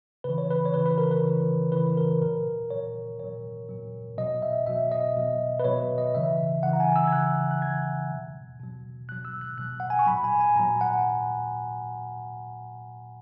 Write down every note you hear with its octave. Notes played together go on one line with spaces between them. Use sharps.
C#3 E3 B4
C#5
B4
C#5
C#3 E3 B4
B4
A#4
B4
C#3 E3
C#3 E3 B4
A#4
A#2 F#3 A#4
A#2 F#3 C#5
A#2 F#3 C#5
A#2 F#3
B2 F#3 D#5
E5
B2 F#3 E5
D#5
B2 F#3
B4
B2 F#3 C#5
D#5
C#3 E3 E5
C#3 E3 F#5
A#5
G#5
E6
G#6
C#3 E3 F#6
F#6
C#3 E3 G#6
B2 F#3
B2 F#3
B2 F#3 F#6
E6
F#6
B2 F#3 F#6
F#5
G#5
C#6
A#2 F#3 B5
G#5
G#5
A#2 F#3 A#5
F#5